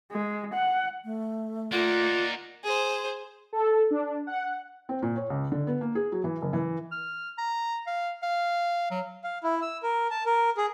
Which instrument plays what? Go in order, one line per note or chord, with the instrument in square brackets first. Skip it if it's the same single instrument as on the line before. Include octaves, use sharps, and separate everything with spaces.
[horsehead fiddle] G#3
F#5
[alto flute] A3
[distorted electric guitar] A#3 D#4 [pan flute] F4 [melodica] D5 F#5
[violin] G#4 C5
[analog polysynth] A4
D4
F#5
[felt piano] C4
A#2
C#5
C#2
D3
B3
A#3
G#4
F#3
E3
F#1
E3
[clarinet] F6
A#5
F5
F5
F#3
[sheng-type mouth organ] F5
E4
E6
A#4
A5
A#4
G#4